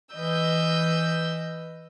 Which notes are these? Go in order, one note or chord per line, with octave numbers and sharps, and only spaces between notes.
E3 B4 D#5 E6 G6